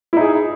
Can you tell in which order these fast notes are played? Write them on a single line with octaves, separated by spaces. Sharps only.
E4 D#4 G#4